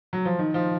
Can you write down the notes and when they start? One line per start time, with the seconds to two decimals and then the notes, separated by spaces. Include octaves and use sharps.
0.13 F#3
0.25 F3
0.39 D#3
0.54 F3